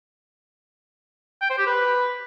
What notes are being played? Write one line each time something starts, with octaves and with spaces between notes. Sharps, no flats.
G5
C5
G4
B4